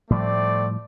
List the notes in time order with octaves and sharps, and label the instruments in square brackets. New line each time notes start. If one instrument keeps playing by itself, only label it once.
[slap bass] A2 F3 G3 [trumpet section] A3 C4 D5